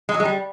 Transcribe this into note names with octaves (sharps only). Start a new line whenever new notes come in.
G#3
F#3
G#3
G3